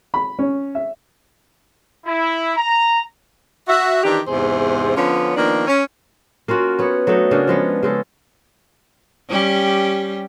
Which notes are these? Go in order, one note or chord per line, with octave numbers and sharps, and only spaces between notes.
B5
C#4
E5
E4
A#5
F#4 E5
D#3 E3 D4 G4
E2 G#2 C3 G#4 C5
D3 F3 B3 C#4
D#3 F3 A#3 B3 D4
C#4
A#3 C#4 F4 F#4
B3 C#5
F#3 A3 D4 D#4
C#3 A#3 C#4 D4
F3 G#3 B3
C#3 G#3 A4
G3 C#4 G4